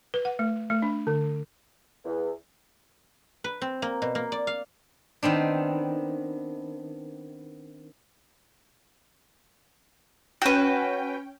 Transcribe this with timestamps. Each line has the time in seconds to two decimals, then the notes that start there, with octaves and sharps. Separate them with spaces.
0.14 B4
0.25 F#5
0.39 A3
0.70 A3
0.82 D4
1.07 D3
2.05 E2
3.44 B4
3.61 C4
3.82 A#3
4.02 B2
4.15 A#3
4.32 D5
4.47 F5
5.23 D#3 B3 C4 D4
10.42 C#4 F#4 B4 G5